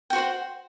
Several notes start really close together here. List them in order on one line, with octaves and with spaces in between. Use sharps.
G5 F#4 C5 F#5